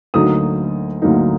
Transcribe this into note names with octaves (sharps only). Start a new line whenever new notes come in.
D2 D3 F#3 A#3 D#4 D#6
D2 D3 F#3 A#3 D#4